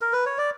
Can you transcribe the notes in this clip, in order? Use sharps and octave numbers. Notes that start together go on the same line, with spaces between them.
A#4
B4
C#5
D5